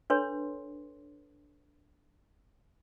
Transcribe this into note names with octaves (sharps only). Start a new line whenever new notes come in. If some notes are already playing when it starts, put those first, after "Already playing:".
D4 A4 B4 C#5 C6